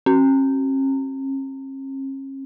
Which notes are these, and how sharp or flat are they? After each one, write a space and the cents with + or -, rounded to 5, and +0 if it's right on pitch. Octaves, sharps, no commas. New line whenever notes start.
C#4 -45